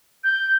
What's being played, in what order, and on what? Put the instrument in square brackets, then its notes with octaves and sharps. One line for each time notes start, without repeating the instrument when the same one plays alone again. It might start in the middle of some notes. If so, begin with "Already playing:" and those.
[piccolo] G6